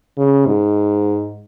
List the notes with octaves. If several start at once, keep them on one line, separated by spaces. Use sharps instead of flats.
C#3
G#2